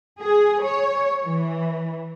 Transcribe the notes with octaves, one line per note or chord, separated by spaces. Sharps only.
G#4
C#5
E3